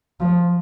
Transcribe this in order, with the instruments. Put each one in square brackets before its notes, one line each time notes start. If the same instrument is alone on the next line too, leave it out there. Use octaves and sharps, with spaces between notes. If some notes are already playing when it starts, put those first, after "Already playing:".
[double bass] F3